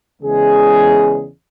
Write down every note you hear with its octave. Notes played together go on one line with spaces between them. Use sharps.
E2 C#3 G#3 G#4